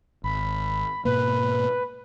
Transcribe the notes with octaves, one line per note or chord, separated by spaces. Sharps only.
G#1 B5
G#2 B2 A#3 B4